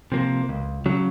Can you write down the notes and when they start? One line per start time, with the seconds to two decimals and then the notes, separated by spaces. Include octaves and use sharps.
0.12 C3 F3 A#3
0.49 C#2
0.86 C#3 F#3 C#4